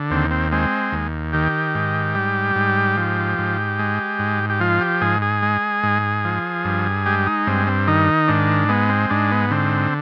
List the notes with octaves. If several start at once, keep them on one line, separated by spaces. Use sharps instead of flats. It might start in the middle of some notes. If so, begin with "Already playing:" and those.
Already playing: D3
D#2 C4
C4
G#3 C4
D#2
D#3 G4
G#2
G3
G#2
F3
G#2
G#3
G#2
G4
F3 F4
G4
G#2 G#4
G#4
G#3
G#2
F3
G2
G#3 G4
D#4
G2 C4
C4
D#3 D#4
G#2 D4
G#3 B3
C4
G#2 D4
B3
D3 C4